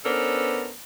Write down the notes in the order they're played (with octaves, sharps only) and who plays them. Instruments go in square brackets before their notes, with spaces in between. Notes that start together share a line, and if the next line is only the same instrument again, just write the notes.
[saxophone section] B3 C#4 D4 A4 A#4 C5